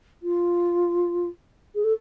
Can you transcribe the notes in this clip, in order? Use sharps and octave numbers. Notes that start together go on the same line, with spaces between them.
F4
G#4
A4